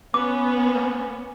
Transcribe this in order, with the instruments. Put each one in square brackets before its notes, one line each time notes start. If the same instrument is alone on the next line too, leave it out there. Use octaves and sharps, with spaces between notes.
[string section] B3 C#4 [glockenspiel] D6